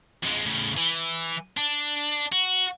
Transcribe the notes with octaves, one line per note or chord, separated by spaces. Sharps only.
F2 G#3
A2 C#3
E3
D4
F#4